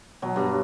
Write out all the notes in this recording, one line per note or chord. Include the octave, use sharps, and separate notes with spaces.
B2 F#3
G2